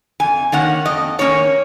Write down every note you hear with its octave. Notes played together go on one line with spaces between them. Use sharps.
F2 G#5
D#3 A#3 C#4 F#5
F2 D#5
D#3 A#3 C#4 C#5